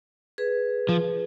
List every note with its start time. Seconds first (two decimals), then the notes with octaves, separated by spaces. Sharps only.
0.38 G#4 B4
0.89 F3